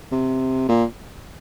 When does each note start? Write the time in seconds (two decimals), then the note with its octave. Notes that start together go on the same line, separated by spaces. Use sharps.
0.12 C3
0.69 A#2